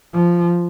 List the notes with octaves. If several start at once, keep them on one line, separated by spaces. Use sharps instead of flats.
F3